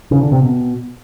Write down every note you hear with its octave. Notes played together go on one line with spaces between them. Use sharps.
C#3
D3
C3
B2